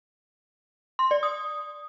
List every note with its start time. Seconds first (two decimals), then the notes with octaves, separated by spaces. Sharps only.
0.99 C6
1.11 D5
1.23 D#6